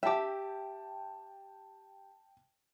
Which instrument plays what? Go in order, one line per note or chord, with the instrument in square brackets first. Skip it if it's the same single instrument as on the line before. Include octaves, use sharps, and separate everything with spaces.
[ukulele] G4 E5 [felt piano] G5 A5